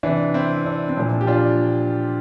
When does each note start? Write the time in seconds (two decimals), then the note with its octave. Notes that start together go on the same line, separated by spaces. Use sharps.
0.03 C3 E3 D4
0.34 C4 E4
0.66 D4
0.89 C4
0.97 A#2 F3 D4
1.21 G4
1.27 D4 F4